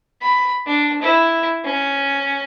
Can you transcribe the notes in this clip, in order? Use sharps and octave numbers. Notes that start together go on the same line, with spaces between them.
B5
D4
E4
C#4